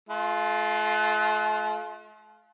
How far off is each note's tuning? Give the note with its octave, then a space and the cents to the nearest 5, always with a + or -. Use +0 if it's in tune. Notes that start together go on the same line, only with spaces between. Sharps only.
A3 -45 F4 +0